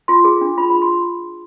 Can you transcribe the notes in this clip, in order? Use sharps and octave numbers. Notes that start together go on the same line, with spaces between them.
F4 C6
G#4
D4
F4 B5
F4 B5
C6